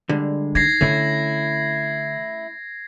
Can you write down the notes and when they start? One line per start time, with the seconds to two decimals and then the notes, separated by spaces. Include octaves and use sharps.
0.09 D3 G3 G#3
0.55 D#4 G#6 A#6 C7
0.81 D3 A3 C#4 E4